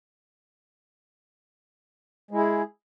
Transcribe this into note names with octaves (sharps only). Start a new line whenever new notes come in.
G#3 E4 G#4